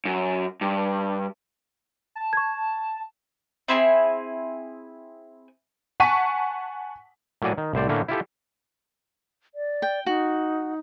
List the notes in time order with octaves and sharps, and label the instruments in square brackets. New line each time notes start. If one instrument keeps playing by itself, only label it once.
[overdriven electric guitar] F#2
G2
[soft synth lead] A5
[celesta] C#6 G#6
[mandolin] C4 E4 F4 G#4
[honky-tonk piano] F#5 G#5 A5 C#6 B6 D#7
[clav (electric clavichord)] A2 F#3 A#3 F#4 D5 G#5
D#3
C2 A2 C5 D5
A2 D3 A3 A#3 C#4
E4 F4 G4 A4
[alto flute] D5
[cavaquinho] G5
[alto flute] D#4 [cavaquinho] F#4